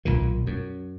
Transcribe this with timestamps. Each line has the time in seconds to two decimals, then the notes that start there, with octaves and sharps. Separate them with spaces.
0.05 B1 A#2 D#3
0.47 F#2